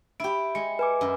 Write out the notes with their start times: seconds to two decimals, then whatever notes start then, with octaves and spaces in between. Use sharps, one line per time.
0.20 E4 G4 D7
0.55 G#3 C#7
0.79 B4 G#5 D6
1.01 F#2